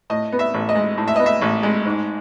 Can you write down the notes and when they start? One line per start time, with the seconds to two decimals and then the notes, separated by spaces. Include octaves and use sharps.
0.10 A2 D#5
0.32 B3
0.39 E5
0.54 A1
0.69 D#5
0.76 G#3
0.98 A2
1.08 E5
1.16 B3 D#5
1.26 E5
1.41 A1
1.63 G#3
1.85 G#2